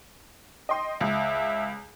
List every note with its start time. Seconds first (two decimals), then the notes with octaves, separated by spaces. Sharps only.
0.69 D#5 G5 C6
1.01 C#2 E5